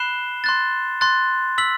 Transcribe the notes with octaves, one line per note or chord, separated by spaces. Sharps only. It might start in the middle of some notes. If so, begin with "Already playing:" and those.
Already playing: B5 F#6 C7 E7 G7
C6 F#6 A6
C6 F#6 A6
E6 B6 F#7